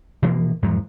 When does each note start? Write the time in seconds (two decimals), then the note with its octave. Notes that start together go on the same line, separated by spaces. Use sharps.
0.22 B2 E3 F3 A#3
0.63 E2 G#2 F3 F#3